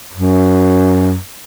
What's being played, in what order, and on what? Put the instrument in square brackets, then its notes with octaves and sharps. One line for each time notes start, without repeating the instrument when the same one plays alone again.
[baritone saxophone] F#2